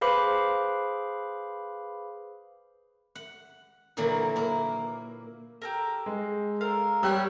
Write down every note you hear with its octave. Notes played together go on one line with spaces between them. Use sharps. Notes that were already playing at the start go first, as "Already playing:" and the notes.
G#4 B4 C5 F5 B5 D6
F#5
A#2 D3 E3 F#3 A#3
A#3 E4
G4 A4 A#4
G#3
A4 A#4 C5 F5
G3 C#5 F#5 B5 E6 F#6